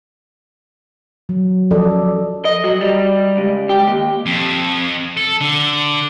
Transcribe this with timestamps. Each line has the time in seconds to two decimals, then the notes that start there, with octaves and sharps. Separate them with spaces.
1.29 F#3
1.71 F3 C#4 A4 D5 D#5
2.45 D#5
2.64 F#3
2.81 G3
3.37 C#2
3.69 G4
3.87 D#2
4.26 F2
5.17 A4
5.41 D3